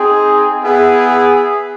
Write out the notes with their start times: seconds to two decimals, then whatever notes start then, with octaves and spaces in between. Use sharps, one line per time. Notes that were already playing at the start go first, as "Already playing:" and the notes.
Already playing: C4 D#4 G#4
0.64 B3 E4 G#4